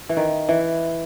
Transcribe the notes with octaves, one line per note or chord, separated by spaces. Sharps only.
E3
D#3
E3